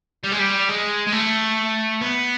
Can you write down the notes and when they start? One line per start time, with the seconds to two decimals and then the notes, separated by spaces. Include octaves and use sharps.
0.24 G3
0.32 G#3
0.39 G3
0.69 G#3
1.07 G#3
1.13 A3
2.01 B3